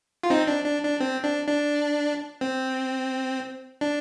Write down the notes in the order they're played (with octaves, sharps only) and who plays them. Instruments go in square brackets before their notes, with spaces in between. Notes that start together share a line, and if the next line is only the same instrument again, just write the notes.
[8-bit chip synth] F4
C4 D#4
D4
D4
D4
C4
D4
D4
C4
D4